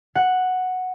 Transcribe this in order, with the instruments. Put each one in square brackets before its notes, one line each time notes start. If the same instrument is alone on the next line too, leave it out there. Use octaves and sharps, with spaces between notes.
[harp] F#5